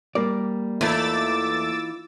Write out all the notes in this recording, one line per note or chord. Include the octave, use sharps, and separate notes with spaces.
G3 A#3 A#4 D5
E2 E3 A3 D#4 F4 D6 E6 A6